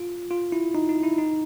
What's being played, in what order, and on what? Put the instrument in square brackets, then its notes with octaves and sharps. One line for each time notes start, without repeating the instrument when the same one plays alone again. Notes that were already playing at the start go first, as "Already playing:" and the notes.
Already playing: [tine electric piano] F4
F4
E4
D#4
D#4
E4
D#4